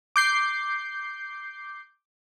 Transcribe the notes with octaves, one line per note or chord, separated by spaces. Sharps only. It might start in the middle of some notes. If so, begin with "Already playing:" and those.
D6 G6 C7